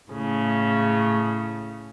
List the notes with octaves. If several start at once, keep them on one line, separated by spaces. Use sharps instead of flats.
A2 C#3